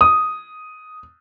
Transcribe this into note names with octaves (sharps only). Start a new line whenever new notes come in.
D#6